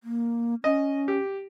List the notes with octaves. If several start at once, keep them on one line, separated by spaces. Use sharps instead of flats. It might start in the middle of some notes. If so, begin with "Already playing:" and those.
A#3
C#4 D#5
G4